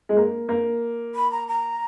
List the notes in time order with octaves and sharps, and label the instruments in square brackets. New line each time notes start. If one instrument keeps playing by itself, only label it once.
[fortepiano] G#3
A#3
A#3
[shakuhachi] B5
A#5
A#5